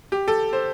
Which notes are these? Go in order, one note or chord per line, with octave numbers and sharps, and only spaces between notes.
G4
A4
C5